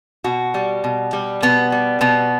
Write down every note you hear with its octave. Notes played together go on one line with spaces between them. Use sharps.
B2 F#4
G3
B2
G3
B2 B3
G3
B2 B3